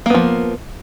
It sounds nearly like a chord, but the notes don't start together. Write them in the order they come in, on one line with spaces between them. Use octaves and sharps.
A#3 B3 F3